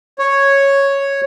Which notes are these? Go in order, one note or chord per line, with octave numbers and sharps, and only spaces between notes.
C#5